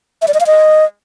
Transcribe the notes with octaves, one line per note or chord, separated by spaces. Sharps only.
E5
D5
D#5
F5
D#5